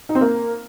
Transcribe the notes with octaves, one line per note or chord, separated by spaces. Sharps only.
D#4
C4
A#3